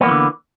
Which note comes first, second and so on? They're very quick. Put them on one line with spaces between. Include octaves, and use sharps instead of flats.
B3 A#3 E3 F#3 D3